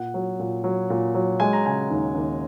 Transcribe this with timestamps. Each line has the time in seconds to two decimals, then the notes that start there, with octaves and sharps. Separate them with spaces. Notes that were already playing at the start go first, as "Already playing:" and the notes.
Already playing: A#2 F#5
0.14 F#3
0.39 A#2
0.64 F#3
0.90 A#2
1.15 F#3
1.40 G#3 G#5
1.53 A#5
1.65 C#3 G#5
1.90 D#2
2.15 D#2